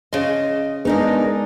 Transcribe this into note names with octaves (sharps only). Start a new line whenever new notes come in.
C#3 D#5 C6
G#3 B3 D4 D#4 G#4 A#4